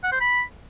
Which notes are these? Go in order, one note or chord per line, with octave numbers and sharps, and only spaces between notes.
F#5
C5
B5